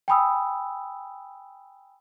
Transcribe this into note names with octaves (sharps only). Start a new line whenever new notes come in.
G5 G#5 B5 D#6 E6